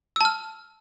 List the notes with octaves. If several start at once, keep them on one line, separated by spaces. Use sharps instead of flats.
A5 E6 F6